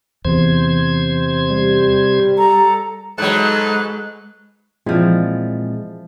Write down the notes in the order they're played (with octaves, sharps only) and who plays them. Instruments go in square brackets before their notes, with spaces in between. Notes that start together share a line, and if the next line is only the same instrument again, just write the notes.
[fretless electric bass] E2 [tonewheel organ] C3 C5 G#6
[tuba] G3
[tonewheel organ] A4 [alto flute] A#5
[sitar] G#2 F#3 [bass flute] G#3 [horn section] D#4 A4 B4 [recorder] F#6
[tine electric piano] A#2 G#3 C4 [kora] E3 F3 D5